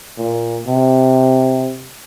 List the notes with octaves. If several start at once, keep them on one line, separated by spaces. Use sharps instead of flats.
A#2
C3